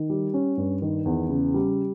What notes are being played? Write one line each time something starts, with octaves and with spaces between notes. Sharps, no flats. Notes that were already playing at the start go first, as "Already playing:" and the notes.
Already playing: D#3
G3
C#4
G2
D#3
E2
C#3
G3